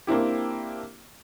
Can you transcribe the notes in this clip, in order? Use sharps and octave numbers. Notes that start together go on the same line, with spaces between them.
A#3 C4 D4 E4 G4